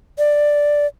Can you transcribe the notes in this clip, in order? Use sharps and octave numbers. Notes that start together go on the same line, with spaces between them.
D5